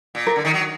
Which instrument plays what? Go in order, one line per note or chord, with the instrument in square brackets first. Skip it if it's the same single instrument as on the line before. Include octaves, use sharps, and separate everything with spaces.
[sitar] A#2
[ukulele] A#4
[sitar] D3
D#3
F#3